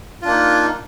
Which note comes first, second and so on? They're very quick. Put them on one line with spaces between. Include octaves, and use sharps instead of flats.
F4 D4 A#3 D#4